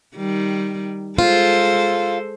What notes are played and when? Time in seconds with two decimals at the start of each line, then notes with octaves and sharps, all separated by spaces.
0.16 D#3 G3
1.18 G#3 F4 A4 C5